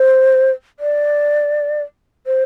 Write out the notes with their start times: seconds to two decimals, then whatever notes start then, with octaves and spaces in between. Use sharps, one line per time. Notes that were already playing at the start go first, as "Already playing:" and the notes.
Already playing: C5
0.80 D5
2.26 C5